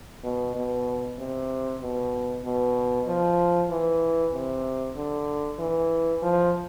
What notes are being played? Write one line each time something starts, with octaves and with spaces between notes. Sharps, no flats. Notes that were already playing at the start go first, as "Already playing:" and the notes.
B2
B2
C3
B2
B2
F3
E3
C3
D3
E3
F3